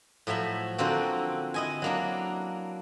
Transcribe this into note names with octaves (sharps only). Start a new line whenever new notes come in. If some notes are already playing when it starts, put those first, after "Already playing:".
A2 F3 F#3 E5
D3 F3 A#3 C4 F#4
E4 D#5 G#5
F#3 A#3 D4